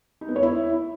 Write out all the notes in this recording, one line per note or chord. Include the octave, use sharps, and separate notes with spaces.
D#4
B3
C#5
E4